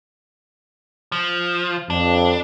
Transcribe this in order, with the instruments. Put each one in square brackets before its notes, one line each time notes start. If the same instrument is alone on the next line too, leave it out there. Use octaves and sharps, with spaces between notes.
[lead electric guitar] F3
[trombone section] F2 [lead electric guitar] D4